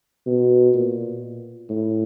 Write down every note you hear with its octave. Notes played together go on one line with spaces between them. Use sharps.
B2
A#2
A2